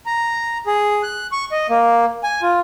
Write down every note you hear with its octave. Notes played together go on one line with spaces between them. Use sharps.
A#5
G#4
F#6
C#6
D#5
A#3
G#5
F4